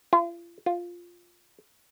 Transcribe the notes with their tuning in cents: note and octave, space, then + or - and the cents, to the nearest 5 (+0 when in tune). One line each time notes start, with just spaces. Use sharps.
F4 -40
F4 +0